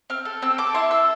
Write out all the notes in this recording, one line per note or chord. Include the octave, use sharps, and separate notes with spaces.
C4 F6
A4
C4 E6
A4 D6
E4 C6
A4 E6